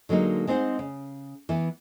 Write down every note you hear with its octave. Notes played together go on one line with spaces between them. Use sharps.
D3 F#3 G#3 A#3 D#4
G#3 C4 D#4 C5 F#5
C#3
E3 B3